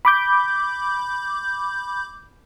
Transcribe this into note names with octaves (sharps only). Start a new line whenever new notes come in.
B5 D6 G6